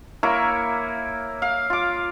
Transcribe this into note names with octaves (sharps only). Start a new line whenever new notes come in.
A#3 E4 A#4 C#5
F5
F4 D6